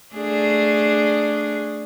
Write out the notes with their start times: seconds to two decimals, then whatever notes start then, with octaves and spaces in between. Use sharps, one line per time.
0.14 A3 D4 G#4